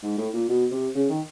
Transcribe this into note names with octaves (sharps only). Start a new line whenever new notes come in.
G#2
A2
A#2
B2
C3
C#3
D#3